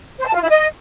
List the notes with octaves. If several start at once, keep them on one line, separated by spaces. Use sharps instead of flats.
C5
A5
F4
E4
D#5